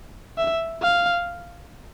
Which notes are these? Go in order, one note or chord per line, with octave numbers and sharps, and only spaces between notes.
E5
F5